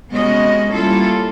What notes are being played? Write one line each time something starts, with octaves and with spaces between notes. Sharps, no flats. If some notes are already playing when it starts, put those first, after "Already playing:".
C3 G#3 B3 C#4 F#4 D#5
G3 A#3 C#4 E4 F4 A4